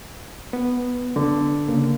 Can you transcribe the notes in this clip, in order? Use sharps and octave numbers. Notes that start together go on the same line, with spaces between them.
B3
D3
C#3 A#3